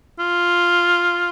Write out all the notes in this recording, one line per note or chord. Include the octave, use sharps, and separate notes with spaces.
F4